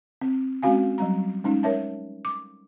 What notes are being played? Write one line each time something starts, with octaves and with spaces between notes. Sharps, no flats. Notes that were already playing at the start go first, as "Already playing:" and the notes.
C4
G#3 C4 C#4 F#4 F5 G#5
F#3 G3 A#5
G#3 C#4 D#4
A#4 C#5 E5 A5
D6